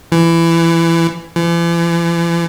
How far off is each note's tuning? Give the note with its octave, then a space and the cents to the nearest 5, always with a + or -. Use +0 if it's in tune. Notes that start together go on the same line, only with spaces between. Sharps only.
E3 +20
E3 +45